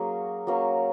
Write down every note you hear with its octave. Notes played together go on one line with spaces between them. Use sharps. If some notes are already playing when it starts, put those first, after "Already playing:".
Already playing: F#3 A#3 C#4 G#4
F#3 A#3 C#4